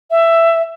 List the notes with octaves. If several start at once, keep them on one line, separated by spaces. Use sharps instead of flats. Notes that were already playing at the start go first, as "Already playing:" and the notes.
E5